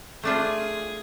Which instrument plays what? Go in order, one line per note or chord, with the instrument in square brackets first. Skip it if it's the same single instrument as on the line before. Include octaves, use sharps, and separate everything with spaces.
[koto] A3 D4 F4 [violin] G#4